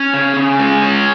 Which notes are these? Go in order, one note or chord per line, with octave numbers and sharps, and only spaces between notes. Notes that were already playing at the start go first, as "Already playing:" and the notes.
Already playing: C#4 C#5
C#3
C#3
G#3
C#4